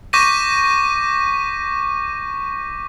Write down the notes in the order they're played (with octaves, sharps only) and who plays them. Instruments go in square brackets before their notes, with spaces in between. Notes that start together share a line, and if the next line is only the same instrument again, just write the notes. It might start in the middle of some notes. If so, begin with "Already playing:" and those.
[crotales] C#6 D6 G6 A#6 B6 D#7